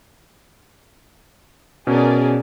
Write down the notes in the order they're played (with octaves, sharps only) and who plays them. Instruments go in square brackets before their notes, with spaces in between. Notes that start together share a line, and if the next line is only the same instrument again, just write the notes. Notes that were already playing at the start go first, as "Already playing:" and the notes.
[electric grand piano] B2 C#4 [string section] G#4 A#4 D5